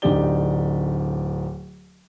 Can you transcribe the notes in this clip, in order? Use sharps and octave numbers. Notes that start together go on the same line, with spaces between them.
D1 D3 D#4 G4 D5 G7